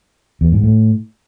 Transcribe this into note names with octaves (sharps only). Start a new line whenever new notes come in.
E2
G#2
A2